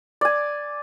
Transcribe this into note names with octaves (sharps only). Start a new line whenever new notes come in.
D5 G#5